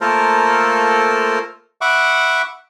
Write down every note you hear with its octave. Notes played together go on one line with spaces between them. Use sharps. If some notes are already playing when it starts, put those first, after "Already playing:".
A3 A#3 F4 A4 A#4 C5
E5 F#5 B5 C#6 D6